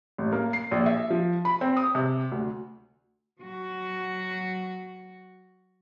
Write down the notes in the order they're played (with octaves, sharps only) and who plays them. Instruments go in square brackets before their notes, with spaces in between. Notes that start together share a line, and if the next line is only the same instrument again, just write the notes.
[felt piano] A1
A#3
C7
A#1
E5
F3
B5
C4
D#6
C3
D2
[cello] F#3 F#4